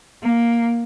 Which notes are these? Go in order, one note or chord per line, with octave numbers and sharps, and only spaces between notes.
A#3